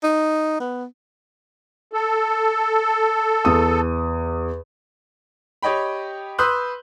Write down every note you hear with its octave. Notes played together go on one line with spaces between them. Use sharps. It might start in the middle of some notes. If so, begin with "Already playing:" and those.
D#4
B3
A4
E2 D#6
G4 C#5 D#5 G5 B5
B4 C6 D#6 E6 F#6 G6